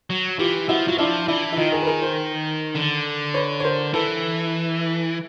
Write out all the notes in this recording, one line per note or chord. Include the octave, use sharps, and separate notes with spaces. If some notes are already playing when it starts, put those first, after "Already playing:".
F#3
E3 F4 G4
F3 E4 F#4
F#3 F4
F3 D4 E4
E3 D4 E4
E4
D#3 D#4 F4
G#4 A#4
B4
G#4 A#4
A#4 C5
D3
B4 C#5
C#5
A#4 C5
E3 A4 B4